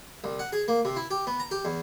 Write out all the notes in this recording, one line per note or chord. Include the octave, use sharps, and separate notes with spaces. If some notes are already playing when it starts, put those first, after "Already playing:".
C2
F#5
G#4
A#3
C3
E4
G4
B3
A#5
G4
E2